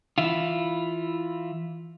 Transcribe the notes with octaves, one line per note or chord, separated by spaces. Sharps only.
E3 E4 F4